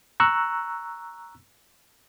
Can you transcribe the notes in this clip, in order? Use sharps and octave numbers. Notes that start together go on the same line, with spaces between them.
A#5 C#6 E6 F#6